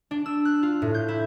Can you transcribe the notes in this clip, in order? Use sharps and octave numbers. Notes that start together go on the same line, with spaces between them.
D4
E6
F#6
F4
A2
G6
E4